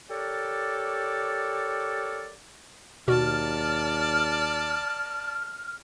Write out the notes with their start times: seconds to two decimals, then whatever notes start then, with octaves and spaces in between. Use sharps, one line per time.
0.10 G4 A4 A#4 C#5 D5
3.08 D#2 B2 F#4 D5 A5 F6